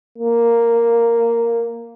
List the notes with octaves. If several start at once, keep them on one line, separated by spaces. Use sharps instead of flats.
A#3